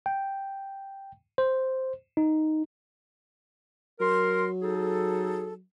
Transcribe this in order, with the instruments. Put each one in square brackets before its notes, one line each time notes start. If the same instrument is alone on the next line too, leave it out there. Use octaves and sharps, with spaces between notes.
[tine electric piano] G5
C5
D#4
[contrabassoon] F#3 [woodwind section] A#4 C6
[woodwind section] D#4 G#4 A4